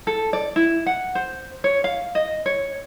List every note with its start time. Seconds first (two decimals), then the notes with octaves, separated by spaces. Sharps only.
0.07 A4
0.33 D5
0.56 E4
0.86 F#5
1.15 C5
1.64 C#5
1.84 F5
2.15 D#5
2.46 C#5